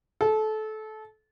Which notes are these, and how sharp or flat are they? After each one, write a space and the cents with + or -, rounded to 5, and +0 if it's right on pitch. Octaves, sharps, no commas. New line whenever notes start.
A4 -25